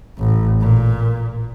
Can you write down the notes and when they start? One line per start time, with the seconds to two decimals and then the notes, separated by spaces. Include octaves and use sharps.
0.18 A1
0.61 A#2